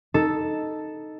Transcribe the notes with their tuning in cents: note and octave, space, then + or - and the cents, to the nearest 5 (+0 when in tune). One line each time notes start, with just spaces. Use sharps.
D#4 +0 A4 +0